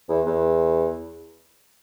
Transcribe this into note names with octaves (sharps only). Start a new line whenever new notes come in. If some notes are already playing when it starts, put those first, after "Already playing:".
E2
E2